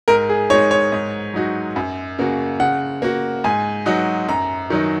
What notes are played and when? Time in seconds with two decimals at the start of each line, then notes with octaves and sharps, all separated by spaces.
0.08 G#2 A#4
0.29 G#4
0.50 G#3 D#4 C#5
0.71 C#5
0.92 G#2
1.34 F#3 D#4 F#4
1.76 F#2
2.19 C#3 A#3 F#4
2.60 C#3 F#5
3.02 A#3 F#4
3.44 G#2 G#5
3.86 F#3 D#4 F#4
4.28 F#2 A#5
4.70 D#3 F#3 D#4